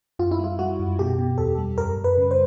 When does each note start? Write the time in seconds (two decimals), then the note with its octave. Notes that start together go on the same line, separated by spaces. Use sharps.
0.19 F#2 F4
0.31 E4
0.39 G3
0.44 F4
0.59 G3 F#4
0.79 F#2
0.99 B2 G4
1.19 B2
1.38 E2 A4
1.58 G3
1.78 F#2 A#4
1.98 F#2
2.04 B4
2.18 C#3
2.31 C5